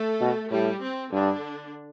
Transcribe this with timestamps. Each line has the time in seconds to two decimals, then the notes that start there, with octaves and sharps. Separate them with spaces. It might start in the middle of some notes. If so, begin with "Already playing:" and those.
Already playing: A3 A4
0.21 B2
0.50 A2 G3 G4
0.81 C4
1.12 G2 D3 D4